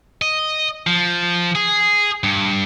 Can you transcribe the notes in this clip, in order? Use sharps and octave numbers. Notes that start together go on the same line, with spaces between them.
D#5
F3
G#4
G2